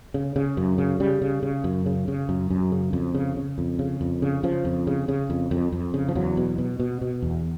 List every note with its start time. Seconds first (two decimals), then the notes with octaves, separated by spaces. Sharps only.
0.14 C#3
0.36 C#3
0.57 F#2
0.78 C#3
1.00 C#3 G3
1.22 C#3
1.43 C#3
1.64 F#2
1.86 C#3
2.08 C#3
2.29 F#2
2.50 F#2
2.72 C#3
2.93 F2
3.14 C#3
3.36 C#3
3.58 F2
3.79 C#3
4.01 F2
4.22 C#3
4.43 C#3 F3
4.65 F2
4.87 C#3
5.08 C#3
5.30 F2
5.51 F2
5.72 F2
5.94 C#3
6.08 F3
6.15 E2 F#3
6.37 B2
6.58 B2
6.79 B2
7.01 B2
7.22 E2